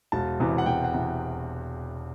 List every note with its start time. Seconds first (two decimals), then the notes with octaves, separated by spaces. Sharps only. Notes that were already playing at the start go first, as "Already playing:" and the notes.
0.12 E1 A5
0.40 E2 C3 E3
0.58 F#5
0.66 E1 G5
0.84 F#5
0.94 C3 E3